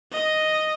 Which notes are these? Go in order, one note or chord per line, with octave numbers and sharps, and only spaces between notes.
D#5